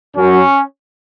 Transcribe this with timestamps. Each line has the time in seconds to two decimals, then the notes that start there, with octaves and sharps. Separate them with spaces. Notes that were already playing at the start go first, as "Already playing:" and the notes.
0.16 F#2 F#3 C#4